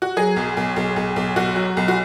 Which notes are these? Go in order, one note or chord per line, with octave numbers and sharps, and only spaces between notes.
F#4
F#3 G#4
B1
B1
B1
B1
B1
B1 F#4
F#3
B1
F#4